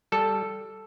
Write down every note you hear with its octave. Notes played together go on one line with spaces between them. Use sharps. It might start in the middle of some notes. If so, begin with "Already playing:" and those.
G3 A4